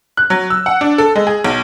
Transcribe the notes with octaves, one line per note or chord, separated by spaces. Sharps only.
F#6
F#3
E6
F#5
D4
A4
G#3
G#4
B1